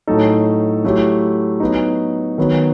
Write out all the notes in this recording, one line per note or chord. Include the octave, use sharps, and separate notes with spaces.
A2 F#3 A3 D#4 A4
F#3 A3 E4 G4
F#3 B3 D#4
D#3 F#3 B3